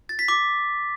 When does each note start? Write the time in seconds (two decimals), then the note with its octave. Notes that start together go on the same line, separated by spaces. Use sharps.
0.09 A6
0.19 B6
0.28 D6